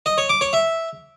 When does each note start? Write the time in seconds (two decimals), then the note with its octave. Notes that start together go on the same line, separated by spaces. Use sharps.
0.06 D#5
0.18 C#5
0.29 D6
0.41 C#5
0.53 E5